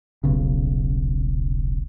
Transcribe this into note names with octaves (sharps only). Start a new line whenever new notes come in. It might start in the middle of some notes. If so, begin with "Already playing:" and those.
D#1 B1 C#3